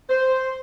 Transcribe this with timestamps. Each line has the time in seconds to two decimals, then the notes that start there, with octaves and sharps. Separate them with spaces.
0.09 C5